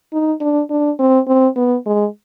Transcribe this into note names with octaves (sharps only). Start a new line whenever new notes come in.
D#4
D4
D4
C4
C4
B3
G#3